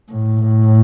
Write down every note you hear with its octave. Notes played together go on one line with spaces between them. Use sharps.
A2